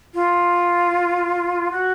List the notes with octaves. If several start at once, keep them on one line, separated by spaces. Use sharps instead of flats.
F4
F#4